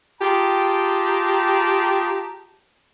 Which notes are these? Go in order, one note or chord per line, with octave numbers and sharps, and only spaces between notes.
F4 G4 G#4 G5 A5 A#5